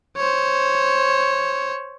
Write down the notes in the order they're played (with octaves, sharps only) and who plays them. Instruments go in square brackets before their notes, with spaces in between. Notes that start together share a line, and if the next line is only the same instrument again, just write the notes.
[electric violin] C5 C#5